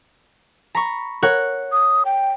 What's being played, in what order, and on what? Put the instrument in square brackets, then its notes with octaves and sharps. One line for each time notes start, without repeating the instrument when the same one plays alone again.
[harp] A#5 B5 C#6
A#4 C#5 F#5
[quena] D#6
G5